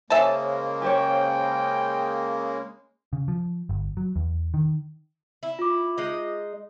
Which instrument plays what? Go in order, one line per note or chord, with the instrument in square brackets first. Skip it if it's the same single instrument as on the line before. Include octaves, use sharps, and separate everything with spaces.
[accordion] C#3 G#3 A#3 [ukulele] C5 C#5 G#5 [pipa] E5 A5
[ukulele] G4 C5 C#5 [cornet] G5
[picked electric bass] C#3
F3
G1
F#3
E2
D#3
[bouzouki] E4
[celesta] F4 D6
[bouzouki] G#3 D#4 D#5